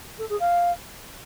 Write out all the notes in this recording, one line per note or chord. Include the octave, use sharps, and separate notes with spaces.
A4
G#4
F5